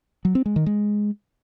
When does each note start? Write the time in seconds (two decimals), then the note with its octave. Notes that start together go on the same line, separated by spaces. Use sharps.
0.25 F#3
0.35 C4
0.46 G#3
0.56 D#3
0.66 G#3